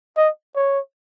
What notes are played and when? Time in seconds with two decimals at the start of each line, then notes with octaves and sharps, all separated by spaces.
0.17 D#5
0.56 C#5